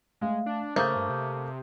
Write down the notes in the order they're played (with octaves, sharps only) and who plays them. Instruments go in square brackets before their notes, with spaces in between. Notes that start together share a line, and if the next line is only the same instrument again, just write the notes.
[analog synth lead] G#3 [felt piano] A3 F5
[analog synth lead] D4
[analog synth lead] C#3 [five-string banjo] A3 A#3 [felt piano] C5 D#6 G6
[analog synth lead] G2
C3